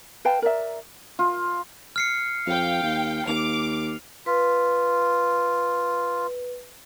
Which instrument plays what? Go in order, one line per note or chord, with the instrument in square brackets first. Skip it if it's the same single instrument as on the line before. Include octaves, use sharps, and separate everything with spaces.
[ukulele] B4 F5 G5 A5
A#4 D5 E5
[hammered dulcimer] F4
[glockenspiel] F6 C7 C#7
[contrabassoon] F2 [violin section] F5 G5
[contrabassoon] D#2
[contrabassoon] D#2 [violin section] D6 [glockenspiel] F7
[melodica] F4 [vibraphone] B4